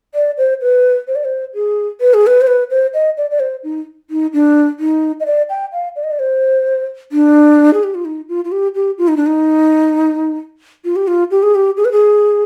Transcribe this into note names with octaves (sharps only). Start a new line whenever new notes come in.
D5
C5
B4
C5
D5
C5
G#4
B4
G#4
B4
C5
B4
C5
D#5
D5
D5
C5
D#4
D#4
D4
D#4
D#5
D5
G5
F5
D5
D#5
D5
C5
D4
G#4
G4
F4
D#4
F4
F4
G4
G4
F4
D#4
D4
D#4
F4
G4
F4
G4
G#4
G4
G#4
B4
G#4